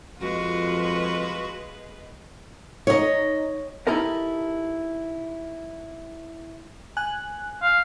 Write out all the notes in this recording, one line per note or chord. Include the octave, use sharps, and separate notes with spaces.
F2 G#3 F4 F#4 B4
D#4 C#5 D#5
D#4 E4 G4 A4 A#4 D#5
G#5 F#6
F5